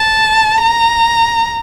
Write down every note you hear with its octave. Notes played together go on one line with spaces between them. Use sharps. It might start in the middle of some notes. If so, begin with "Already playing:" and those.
Already playing: A5
A#5